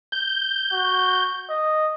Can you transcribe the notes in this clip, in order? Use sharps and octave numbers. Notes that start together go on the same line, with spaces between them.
G6
F#4
D#5